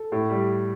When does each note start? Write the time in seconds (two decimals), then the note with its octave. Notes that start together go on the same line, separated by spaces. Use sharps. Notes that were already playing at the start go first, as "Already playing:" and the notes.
Already playing: A4
0.12 A2
0.30 G3